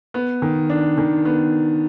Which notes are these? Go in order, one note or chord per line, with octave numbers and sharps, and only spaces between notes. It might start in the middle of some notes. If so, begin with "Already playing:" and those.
B3
D#3
D4
D#3
B3